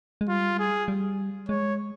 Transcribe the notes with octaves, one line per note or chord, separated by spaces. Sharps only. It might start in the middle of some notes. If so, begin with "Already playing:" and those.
G#3
G3 F4
G#4
G3
G#3 C#5